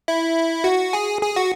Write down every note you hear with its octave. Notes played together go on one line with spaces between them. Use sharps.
E4
F#4
G#4
G#4
F#4